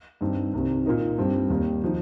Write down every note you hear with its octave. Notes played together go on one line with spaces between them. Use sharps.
G2 D#3 C4 D#4
C2 C3 D#3
A#2 A#3 D#4
G2 G3 C4
D#2 D#3 G3 D#4
F3 D#4